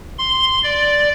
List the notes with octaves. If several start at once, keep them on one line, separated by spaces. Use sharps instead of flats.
C6
D5